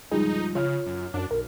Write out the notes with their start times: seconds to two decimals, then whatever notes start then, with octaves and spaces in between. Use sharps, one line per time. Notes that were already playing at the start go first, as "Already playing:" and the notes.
0.11 C#2 G2 F3 D#4 G#4
0.55 C#3 F4 C#5 F6
0.86 F#2
1.14 F#2 D4
1.31 B1 A#4